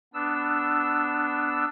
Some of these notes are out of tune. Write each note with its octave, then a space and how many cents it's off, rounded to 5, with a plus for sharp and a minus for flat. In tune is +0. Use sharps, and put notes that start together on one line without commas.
B3 +10 D4 +0 E6 +5